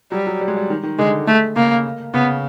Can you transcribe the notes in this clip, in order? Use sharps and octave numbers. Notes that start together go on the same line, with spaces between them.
F#3 G3
F#3
G3
G#3
G3
D#3
D#3
D3 G#3
A3
C#3 A#3
C#3 B3